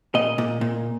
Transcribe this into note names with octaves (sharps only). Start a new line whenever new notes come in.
A#2 D#5
A#2
A#2